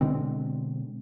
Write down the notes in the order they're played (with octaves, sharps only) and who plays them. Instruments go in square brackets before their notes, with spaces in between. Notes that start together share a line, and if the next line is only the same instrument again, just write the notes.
[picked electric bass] B2 D3 G#3 C4